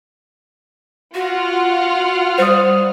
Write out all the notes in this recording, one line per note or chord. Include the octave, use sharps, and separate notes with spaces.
F4 F#4 F#5 F6
G3 C5 D#6